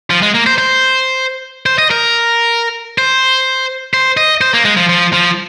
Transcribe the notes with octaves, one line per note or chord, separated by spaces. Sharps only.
F3
G#3
A#3
C5
C5
C5
D#5
A#4
C5
C5
D#5
C5
A#3
G#3
F3
F3
F3